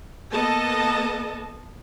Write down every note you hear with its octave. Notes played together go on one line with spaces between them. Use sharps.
A#3 B3 A4 D#5 A5